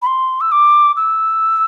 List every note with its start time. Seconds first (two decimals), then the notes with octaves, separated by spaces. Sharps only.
0.02 B5
0.07 C6
0.41 E6
0.52 D6
0.96 E6